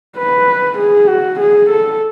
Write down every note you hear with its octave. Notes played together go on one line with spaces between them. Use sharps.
B4
G#4
F#4
G#4
A4